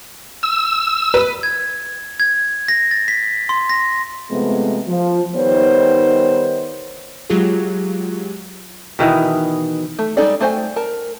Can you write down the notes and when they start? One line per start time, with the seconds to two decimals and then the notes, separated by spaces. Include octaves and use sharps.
0.43 E6
1.14 B4
1.43 G#6
2.20 G#6
2.68 A#6
2.91 A6
3.08 B6
3.49 C6
3.70 A#6
4.31 C3 F3 G#3 A3 B3
4.88 F3
5.35 D#3 G3 B3 D#4 C5 C#5
7.30 F#3 G#3 F4 G4 G#4
8.99 B2 D#3 E3 E4
9.99 A3
10.17 G3 G#3 D#4 A4 D5
10.41 A3 F#4 C5 G5 G#5
10.76 A#4 A5